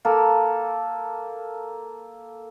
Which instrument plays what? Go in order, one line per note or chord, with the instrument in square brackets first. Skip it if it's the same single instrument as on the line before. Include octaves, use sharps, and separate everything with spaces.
[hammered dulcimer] A#3 A4